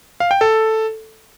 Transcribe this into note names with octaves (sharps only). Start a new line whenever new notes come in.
F5
G5
A4